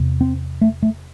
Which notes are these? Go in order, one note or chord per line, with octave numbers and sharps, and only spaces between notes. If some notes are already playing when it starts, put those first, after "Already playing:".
Already playing: E2 C3
C4
A3
A3